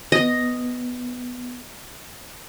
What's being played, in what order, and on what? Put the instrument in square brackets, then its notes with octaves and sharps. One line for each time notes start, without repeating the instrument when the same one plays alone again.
[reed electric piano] B3 [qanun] D#5